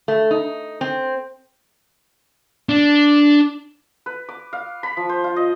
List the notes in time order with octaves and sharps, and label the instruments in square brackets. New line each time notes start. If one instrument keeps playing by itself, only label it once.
[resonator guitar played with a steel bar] A3
D#4
C4
[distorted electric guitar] D4
[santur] B4
D6
F5
B5
F3
C5
F4
D#5